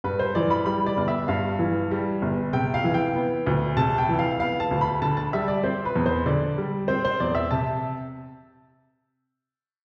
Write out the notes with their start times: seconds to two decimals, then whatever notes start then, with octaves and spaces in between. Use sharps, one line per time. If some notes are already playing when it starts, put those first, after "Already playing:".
0.04 G2 B4
0.19 C5
0.35 E3 D5
0.50 B5
0.66 G3 B5
0.86 D5
0.97 G1
1.08 E5
1.28 G2 F5
1.59 E3
1.91 G3
2.22 G1
2.53 C3 G5
2.74 F5
2.84 E3
2.94 G5
3.15 B3
3.47 D2
3.77 C3 A5
3.98 G5
4.09 E3
4.19 F5
4.40 B3 F5
4.60 A5
4.71 D2
4.81 B5
5.02 D3 A5
5.17 A5
5.33 G3 E5
5.48 D5
5.63 C4 C5
5.85 B4
5.96 E2
6.06 C5
6.26 D3 D5
6.58 G3
6.88 C4 C5
7.05 C5
7.20 E2 D5
7.35 E5
7.51 C3 A5